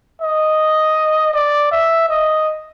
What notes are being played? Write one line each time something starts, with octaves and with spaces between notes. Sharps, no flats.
D#5
D5
E5
D#5